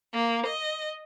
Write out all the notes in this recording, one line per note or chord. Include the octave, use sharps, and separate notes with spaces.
A#3
D#5